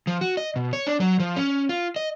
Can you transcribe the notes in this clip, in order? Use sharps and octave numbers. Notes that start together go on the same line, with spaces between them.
F3
F#4
D#5
B2
C#5
D4
F#3
F3
C#4
F4
D#5